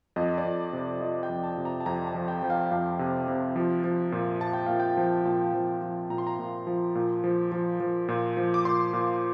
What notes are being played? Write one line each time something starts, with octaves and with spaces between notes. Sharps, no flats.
F2 D#5
D5
F2
C3
F3 D#5
G5
F2
A5
C3
A#5
A5
F2 A#5
A5
F3
G5
F3 G5
F5
F2 F5
C3
C3
F3
F3
A#2
A#2 A5
G5
A#2 F5
G5
F3
A#2 A5
F3
F3
A#2 A#5
C6
A#5
A#2
F3
A#2
F3
F3
F3
A#2
F3
D6
A#2 C6
A#2